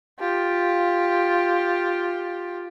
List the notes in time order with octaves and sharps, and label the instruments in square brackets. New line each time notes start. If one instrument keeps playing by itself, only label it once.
[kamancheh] F4 G4